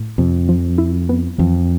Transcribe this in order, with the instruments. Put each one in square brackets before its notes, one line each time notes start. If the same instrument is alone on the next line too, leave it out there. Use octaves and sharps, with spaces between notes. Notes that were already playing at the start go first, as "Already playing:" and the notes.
Already playing: [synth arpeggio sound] A2
[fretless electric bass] F2 [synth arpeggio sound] C3
[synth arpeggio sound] F3
E4
B3
[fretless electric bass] F2 [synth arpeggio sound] E3